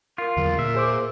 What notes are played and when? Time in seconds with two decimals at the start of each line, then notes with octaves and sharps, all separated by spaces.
0.18 F4 A#4
0.37 E2 D3 F#3
0.59 A#2 E5
0.75 G#4 C5 D6